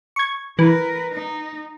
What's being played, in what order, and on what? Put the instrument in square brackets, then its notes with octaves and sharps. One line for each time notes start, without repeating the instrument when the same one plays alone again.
[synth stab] C#6 G#6
[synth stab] E3 [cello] A#4 B4
[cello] D#4